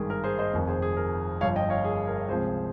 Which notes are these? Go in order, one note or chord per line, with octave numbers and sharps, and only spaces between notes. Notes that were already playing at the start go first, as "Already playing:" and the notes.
Already playing: G#1 G2 D#3 G#4
A#4
G#4 C5
C5 D#5
F1 F2 D#3
G#4 C5
G#4
A#4
G1 G2 F3 C#5 F5
D#5 G5
C#5 F5
G#4
A#4
C#2 C3 F3 G#4 C5